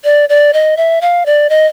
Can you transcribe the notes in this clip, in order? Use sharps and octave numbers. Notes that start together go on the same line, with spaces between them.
D5
D5
D#5
E5
F5
D5
D#5